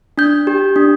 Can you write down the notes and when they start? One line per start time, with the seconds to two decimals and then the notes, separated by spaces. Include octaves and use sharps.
0.18 D4 G6
0.47 G4
0.76 D4